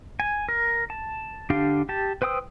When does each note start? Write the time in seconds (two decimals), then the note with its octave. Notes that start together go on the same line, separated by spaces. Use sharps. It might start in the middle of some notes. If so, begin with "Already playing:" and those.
0.20 G#5
0.49 A#4
0.90 A5
1.50 D3 D4 G4 F5
1.89 G4 A5
2.22 B4 C5 G5 D#6 E6